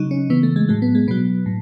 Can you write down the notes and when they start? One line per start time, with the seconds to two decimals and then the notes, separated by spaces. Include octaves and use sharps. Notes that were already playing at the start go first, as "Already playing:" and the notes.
Already playing: C#3 F#3 D#4
0.11 C#4
0.30 C#3 E3 B3
0.43 A3
0.56 G#3
0.68 A2 F#3 G#3
0.82 B3
0.95 G#3
1.08 B2 F#3 B3
1.46 A2